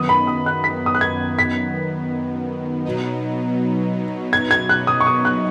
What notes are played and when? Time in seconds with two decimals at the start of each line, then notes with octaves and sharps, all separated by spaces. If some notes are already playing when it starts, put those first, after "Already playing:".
Already playing: F#2 D#3 B3 D#6
0.09 B5
0.27 D#6
0.46 F#6
0.64 B6
0.86 D#6
0.95 F#6
1.01 G#6
1.39 B6
2.85 B2 F#3 B3 D#4
4.33 G#6
4.51 G#6
4.69 F#6
4.87 D#6
5.01 C#6
5.07 D#6
5.25 F#6